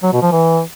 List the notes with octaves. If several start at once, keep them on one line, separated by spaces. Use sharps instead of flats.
F#3
B2
F3
E3